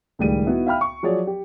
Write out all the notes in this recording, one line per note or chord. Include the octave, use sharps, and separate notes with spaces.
C#2 A2 D#3 G3 G#4 D#7
B3 D#4 E4 F#4 F#5
E5 F5 G5 B5 F6
C#6
F3 F#3 G#4 C#5 D5
G4